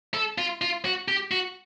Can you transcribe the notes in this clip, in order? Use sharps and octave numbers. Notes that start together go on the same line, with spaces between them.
A4
F4
F4
F#4
G4
F#4